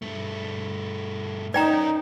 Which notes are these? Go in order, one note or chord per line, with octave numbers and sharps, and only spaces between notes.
G2 A3
C#4 D#4 A#4 D5 G5 A#5